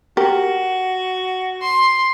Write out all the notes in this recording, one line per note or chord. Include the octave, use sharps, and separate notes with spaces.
F#4 G4 A#4
C6